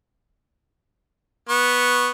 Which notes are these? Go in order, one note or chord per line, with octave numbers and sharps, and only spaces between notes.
B3 C#6